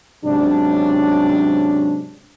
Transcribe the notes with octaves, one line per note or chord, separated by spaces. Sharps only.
G#2 C3 F#3 C#4 D4